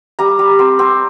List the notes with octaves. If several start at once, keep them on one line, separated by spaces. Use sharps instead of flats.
G3 A#5
G3
C4
C4